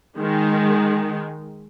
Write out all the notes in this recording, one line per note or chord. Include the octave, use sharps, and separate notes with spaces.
D#3 G#3